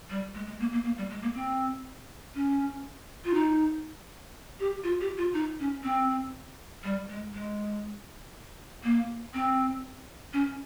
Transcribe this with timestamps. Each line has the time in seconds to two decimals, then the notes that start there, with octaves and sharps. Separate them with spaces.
0.10 G3
0.35 G#3
0.46 G#3
0.60 A#3
0.72 A#3
0.85 A#3
0.98 G3
1.10 G#3
1.22 A#3
1.35 C4
2.35 C#4
3.25 F4
3.34 D#4
4.60 G4
4.84 F4
5.01 G4
5.17 F4
5.34 D#4
5.60 C#4
5.83 C4
6.84 G3
7.09 G#3
7.34 G#3
8.83 A#3
9.34 C4
10.33 C#4